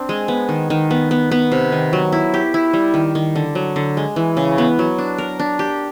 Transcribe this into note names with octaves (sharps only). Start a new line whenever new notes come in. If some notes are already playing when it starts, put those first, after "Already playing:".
Already playing: C4 D4
G#3
B3
D#3
D#3
B3
B3
B3
C3
D#3
F#3
E4
G4
E4
G3
D#3
D#3
D3
F#3
D3
G#3
E3
C#3
B3
F#3
D4
A#4
D4
G4